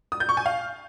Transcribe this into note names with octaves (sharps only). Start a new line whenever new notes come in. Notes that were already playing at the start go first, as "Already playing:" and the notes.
D#6
G6
C#6
G#5
F5